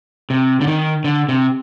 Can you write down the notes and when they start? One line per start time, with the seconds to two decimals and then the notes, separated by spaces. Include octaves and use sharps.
0.30 C3
0.61 D3
0.67 D#3
1.04 D3
1.29 C3